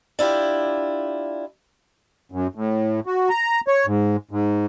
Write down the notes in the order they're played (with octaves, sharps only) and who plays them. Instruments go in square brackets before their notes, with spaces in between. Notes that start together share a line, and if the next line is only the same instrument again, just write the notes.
[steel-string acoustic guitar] D4 E4 F4 G4
[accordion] F#2
A2
F#4
A#5
C#5
G#2
G#2